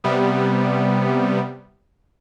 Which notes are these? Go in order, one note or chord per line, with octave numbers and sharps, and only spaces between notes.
C3 G3 B3